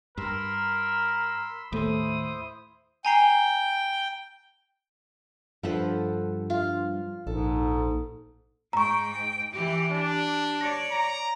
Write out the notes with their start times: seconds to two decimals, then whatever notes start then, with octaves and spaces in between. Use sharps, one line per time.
0.18 G2 A#4 B5 C6 E6
1.72 D#2 A2 A3 E4 C5 D#6
3.05 G5 G#5 A#5 C7
5.63 G2 F3 A4 B4 C5 F#5
6.50 F4 F5
7.27 A#1 G#2 A4
8.73 G#2 G5 A#5 C#6
9.52 E3 G4
9.92 D4 G4
10.61 C#5 D5 A#6
10.91 A#5